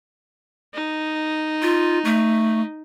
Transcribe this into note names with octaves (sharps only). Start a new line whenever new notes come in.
D#4
F4
A3